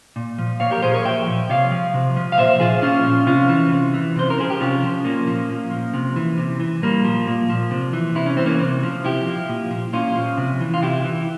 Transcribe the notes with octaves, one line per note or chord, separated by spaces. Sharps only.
A#2
F3
A#2 C#5 F5
G4 A#4
F3 G#4 C5
A#4 C#5
A#2 E5 G5
F3
C3 C#5 F5
F3
C3
F3
F5
A#2 C5 E5
F3 F4 G#4
A#2 C#4 F4
F3
C3 C#4 F4
E3
C3
E3
C3 C5
A#4
F3 G#4
G4
C3 C#4 F4
F3
A#2 A#3 C#4
F3
A#2
F3
C3
E3
C3
E3
A#2 G3 A#3
F3
A#2
F3
C3
E3
C3 E4
C#4
E3 C4
A#3 C#4
C3
F3
C3 E4 G4
F3
A#2
F3
A#2 C#4 F4
F3
C3
E3
F4
C3 E4 G4
E3